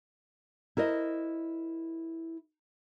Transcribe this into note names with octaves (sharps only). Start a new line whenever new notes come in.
E4 A#4 C5 D#5